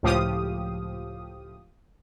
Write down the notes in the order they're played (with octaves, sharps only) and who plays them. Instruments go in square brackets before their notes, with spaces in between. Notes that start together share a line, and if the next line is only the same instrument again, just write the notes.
[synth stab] C#2 A2 F3 G4 F5 D#6